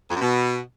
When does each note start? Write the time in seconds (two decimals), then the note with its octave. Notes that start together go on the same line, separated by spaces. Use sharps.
0.10 F2
0.16 F#2
0.21 B2